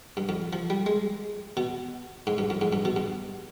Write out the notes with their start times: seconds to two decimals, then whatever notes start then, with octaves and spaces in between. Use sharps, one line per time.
0.17 G2
0.29 F2
0.53 F3
0.70 G3
0.86 G#3
1.57 B2
2.27 G#2
2.38 G2
2.50 F2
2.61 G#2
2.73 G2
2.85 B2
2.96 G2